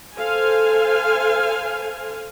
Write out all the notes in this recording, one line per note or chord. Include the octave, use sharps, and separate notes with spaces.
A4 C5 F5 G#5